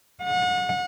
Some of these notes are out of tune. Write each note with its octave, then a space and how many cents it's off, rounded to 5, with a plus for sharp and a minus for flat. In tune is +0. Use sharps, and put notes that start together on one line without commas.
F#5 -35